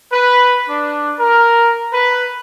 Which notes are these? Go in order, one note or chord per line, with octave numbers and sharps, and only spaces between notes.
B4
D4
A#4
B4